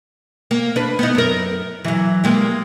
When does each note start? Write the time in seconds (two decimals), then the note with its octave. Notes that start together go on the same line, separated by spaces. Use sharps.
0.51 A#3
0.76 D4 B4
0.99 B3 D#4
1.15 F#2 A#4
1.85 E3 F#3
2.24 G3 G#3 A#3